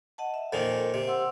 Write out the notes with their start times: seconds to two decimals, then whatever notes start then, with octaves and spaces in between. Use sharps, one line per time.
0.18 D#5 F#5 A5
0.34 E5
0.53 F2 A#2 D#3 A4 A#4
0.94 C3
1.07 F#5 C6 E6